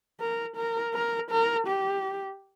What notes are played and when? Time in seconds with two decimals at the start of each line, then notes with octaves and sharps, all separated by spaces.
0.20 A#4
0.56 A#4
0.94 A#4
1.31 A#4
1.67 G4